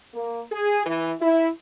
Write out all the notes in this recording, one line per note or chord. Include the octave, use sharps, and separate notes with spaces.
A#3
G#4
E3
E4